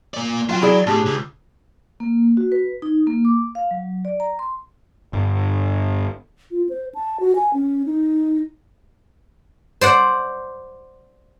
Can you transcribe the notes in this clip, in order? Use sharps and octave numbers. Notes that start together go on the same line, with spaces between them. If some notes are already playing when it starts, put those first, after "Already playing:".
A#3 D5
F#3 F4 F5 G5
E4 G#4 D5
A2 D4 G4 G#4
C#2
A#3
F#4
B4
D#4
A#3
D6
F5
F#3
D5
A#5
C6
G1
F4
C5
A5
F#4
G#5
C#4
D#4
C5 D5 F#5